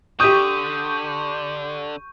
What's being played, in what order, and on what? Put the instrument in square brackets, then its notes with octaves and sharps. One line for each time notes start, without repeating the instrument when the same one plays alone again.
[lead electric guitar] D3 [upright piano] G4 D#6 [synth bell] C#6 G6 D#7